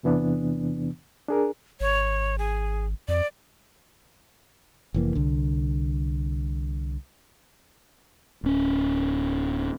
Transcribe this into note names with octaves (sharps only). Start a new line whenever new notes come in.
E2 C3 E3 B3 D4
D4 G#4 A#4
G#1 C#5
G#4
F2 D5
F1 E3 A#3
C2 D3
D1 C#4